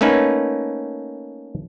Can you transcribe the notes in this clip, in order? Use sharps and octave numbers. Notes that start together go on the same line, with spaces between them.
A3 A#3 C#4 D#4 B4